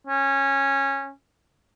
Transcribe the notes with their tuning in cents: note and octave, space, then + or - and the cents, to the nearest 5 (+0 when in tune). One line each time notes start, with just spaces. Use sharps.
C#4 -15